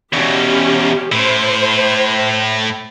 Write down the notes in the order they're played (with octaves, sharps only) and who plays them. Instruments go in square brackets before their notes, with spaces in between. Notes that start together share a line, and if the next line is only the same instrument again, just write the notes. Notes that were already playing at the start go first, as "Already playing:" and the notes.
[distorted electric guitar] E2 B2 [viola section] C#4 G4
[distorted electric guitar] A2 E4 [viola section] C5